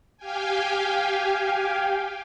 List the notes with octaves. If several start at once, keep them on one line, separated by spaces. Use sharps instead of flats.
G4 F5 G5 G#5